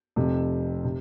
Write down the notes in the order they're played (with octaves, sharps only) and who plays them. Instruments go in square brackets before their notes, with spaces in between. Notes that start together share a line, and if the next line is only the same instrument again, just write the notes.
[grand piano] F1 F2 C3
C3